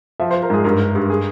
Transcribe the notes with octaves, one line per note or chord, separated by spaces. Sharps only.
F3 E5
C5
F3
A#4
G#2 G#4
G2 A#4
G2
G2
G#4